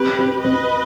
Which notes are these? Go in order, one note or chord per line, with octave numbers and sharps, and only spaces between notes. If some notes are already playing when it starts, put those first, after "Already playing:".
Already playing: C4 G4 B4
C4
C4 B4 D#5